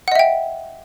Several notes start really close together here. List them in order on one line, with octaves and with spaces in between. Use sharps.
F#5 D#5 E5 G5